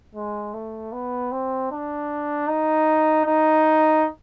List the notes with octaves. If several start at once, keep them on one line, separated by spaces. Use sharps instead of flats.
G#3
A3
B3
C4
D4
D#4
D#4